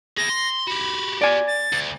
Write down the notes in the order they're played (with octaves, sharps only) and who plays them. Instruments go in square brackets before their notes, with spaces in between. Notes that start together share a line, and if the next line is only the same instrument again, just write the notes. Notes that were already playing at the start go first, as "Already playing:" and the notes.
[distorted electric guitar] E4 G#4 [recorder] A#6
[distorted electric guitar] C6
[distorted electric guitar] F#4 G4 [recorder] B5
[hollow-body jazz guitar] D5 G#5
[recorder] A6
[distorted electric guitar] D2